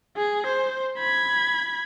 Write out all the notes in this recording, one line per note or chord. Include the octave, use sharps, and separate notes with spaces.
G#4
C5
B5 G#6